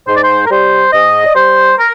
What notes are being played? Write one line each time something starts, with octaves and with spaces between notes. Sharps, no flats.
G#2 C5
D5
C5
A#4
G3 C5
G#2 D#5
D5
G3 C5
A#4